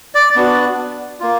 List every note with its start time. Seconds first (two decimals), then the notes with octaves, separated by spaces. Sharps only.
0.15 D5
0.36 B3 D4 F#4
1.20 A#3 F4